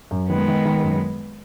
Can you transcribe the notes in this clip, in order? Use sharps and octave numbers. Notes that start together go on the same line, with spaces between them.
F#2
D#3 G#3 B3
D#3
D#3
F#2